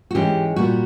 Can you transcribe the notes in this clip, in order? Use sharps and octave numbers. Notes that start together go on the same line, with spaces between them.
F#4
G#2 E3 G#3 C#4 G4
A#2 G3 B3 F#4